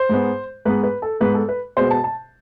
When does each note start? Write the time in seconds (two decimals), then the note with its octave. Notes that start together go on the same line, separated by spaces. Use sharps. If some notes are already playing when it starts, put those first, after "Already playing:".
Already playing: C5
0.09 G#2 G#3 B3
0.65 G#2 G#3 B3 B4
0.84 B4
1.02 A4
1.20 G#2 G#3 B3 B4
1.35 A4
1.49 B4
1.77 B2 G#3 B3 C5
1.91 A5
2.04 A5